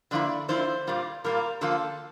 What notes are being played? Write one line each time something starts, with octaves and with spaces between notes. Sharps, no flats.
D3 F3 A#3 E4 D5
D3 F3 A#3 E4 C5
A#2 G3 A#3 F4
A#2 G3 A#3 F4 A#4
D3 F3 A#3 F4 A4